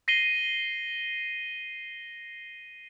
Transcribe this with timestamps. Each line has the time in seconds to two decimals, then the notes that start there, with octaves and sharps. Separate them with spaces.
0.08 A#6 C7 D#7 G7